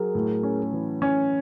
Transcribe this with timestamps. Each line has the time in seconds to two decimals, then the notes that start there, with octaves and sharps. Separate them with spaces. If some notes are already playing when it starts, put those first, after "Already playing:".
Already playing: F#3 G#4 A#4
0.15 A2
0.43 C#4
0.72 E3
1.02 C#4